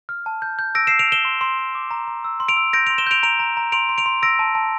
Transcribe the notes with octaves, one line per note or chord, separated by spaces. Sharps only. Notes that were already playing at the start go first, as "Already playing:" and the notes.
F6
A5
G6
G6
E6 A#6 D7
E6 C7 E7
D7 F7
E6 E7 G7
C6
C6
C6
D6
A#5
A#5
E6
C6
D7 F7
E6
G6 A#6 D7
C6 D7 F7
E7 G7
G6 D7 F7
A#5 D7 F7
A#5
A#5
C6 D7 F7
C6
D7 F7
C6
E6 A#6 D7
A5
A5